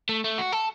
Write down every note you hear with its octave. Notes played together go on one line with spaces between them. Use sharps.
A3
A3
F#4
A4